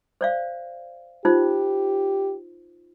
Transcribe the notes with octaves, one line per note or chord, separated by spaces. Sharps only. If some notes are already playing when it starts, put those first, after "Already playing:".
C5 D5 F5
D#4 F4 G4 C5